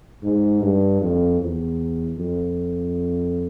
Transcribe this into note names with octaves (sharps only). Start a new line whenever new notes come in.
G#2
G2
F2
E2
F2